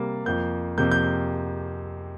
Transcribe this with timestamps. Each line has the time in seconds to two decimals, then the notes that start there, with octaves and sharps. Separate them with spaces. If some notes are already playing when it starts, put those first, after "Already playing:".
Already playing: C3 G3 A#3
0.26 F2 F3 A#3 G6
0.78 F2 C3 A#3 G6
0.92 G6